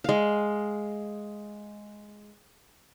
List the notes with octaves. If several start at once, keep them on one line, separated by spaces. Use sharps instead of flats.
G#3 F5